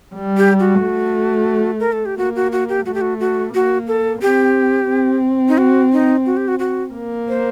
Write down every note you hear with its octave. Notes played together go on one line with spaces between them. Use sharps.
G3
G4
F#4
A3
A#4
A4
G4
A#3 F#4
F#4
F#4
G4
A3 F#4
G4
F#4
F#4
A#3 F#4
A4
C4 G4
C4
D#4
F#4
D#4
F#4
G4
F#4
F#4
A#3
C5